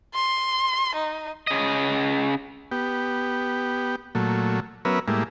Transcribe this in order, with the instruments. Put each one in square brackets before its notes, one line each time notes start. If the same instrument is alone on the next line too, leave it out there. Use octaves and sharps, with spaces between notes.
[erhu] C6
D#4
[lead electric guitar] C#3 D#5
[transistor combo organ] B3 G4
A#2 F#3 A3
F#3 B3 C#4 A#4 B4 E5
A2 G3 G#3 A#3 E4